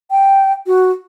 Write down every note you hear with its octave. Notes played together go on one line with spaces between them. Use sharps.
G5
F#4